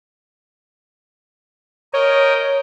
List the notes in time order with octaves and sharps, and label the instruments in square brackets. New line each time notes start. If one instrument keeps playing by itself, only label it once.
[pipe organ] A#4 D#5 G5 [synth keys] C#5